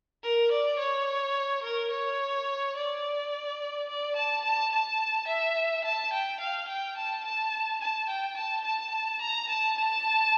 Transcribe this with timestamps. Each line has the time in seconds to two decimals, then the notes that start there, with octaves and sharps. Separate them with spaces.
0.23 A#4
0.51 D5
0.79 C#5
1.62 A#4
1.91 C#5
2.76 D5
3.88 D5
4.16 A5
4.44 A5
4.72 A5
5.27 E5
5.84 A5
6.13 G5
6.40 F5
6.68 G5
6.97 A5
7.25 A5
7.81 A5
8.09 G5
8.37 A5
8.64 A5
9.21 A#5
9.49 A5
9.77 A5